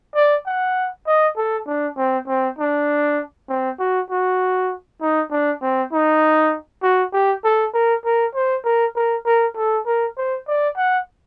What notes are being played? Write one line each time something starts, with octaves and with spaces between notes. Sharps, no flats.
D5
F#5
D#5
A4
D4
C4
C4
D4
C4
F#4
F#4
D#4
D4
C4
D#4
F#4
G4
A4
A#4
A#4
C5
A#4
A#4
A#4
A4
A#4
C5
D5
F#5